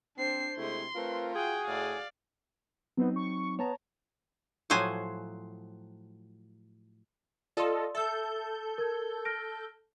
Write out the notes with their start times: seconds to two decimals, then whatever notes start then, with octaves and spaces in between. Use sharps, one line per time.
0.18 C4 D4 C5 C7
0.58 C3 G#3 A3 E4 C6
0.95 A3 C4 F4 A#4 B4
1.35 F#4 G#4 G5 G#5
1.67 A2 D5 F5
2.97 F#3 B3 C4 D#4
3.16 C#6
3.59 B3 C#5 A5 A#5
4.70 A2 F3 F#3 C5 G#5
7.57 F4 A4 D5 D#5 C6
7.95 A4 E5 E6 G6
8.78 A#4 G#6
9.25 F6 A#6 D7